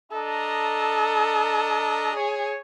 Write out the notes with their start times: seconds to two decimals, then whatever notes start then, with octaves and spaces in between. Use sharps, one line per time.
0.12 D4 A4 D#5 A#5
2.15 G#4 C#5